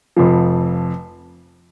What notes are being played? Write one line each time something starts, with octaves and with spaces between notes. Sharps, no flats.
F1 F2 F3